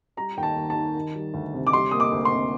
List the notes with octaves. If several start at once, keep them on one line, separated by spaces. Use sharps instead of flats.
G3 A#5
D#2 G5
A5
D#2
A5
D#3
D#3
G3
D2
C3
D6
G3 C6
A#3 D#6
D6
D2
C6
C3